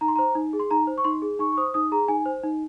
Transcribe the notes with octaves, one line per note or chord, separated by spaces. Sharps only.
D#4 A#5
C6
C5 A#5
D#4
G#4
C6
D#4 A#5
C5
C#6
D#4 C6
G#4
D#4 C#6
C#6
C5 D#6
D#4 D#6
G#4 A#5
D#4 G#5
C5
D#4